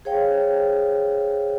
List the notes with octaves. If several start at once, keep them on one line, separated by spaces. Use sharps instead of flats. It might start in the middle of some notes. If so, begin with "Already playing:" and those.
G#4 C5 C#5 F5 G5